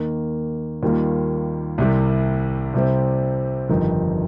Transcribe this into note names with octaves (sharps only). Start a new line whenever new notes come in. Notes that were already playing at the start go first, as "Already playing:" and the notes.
Already playing: D#2 D#3 A#3
D#2 D#3 G3 A#3 F4
C2 C3 G3
C2 C3 G3 C4
G1 F2 D#3 G3 D#4